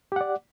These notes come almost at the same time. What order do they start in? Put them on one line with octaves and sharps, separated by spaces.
G4 F#5 D5